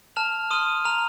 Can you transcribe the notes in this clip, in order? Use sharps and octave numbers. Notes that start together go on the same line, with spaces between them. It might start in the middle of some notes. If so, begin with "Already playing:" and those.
A5 F6 F7
C6 D#6 F6 D#7
A#5 F6 F7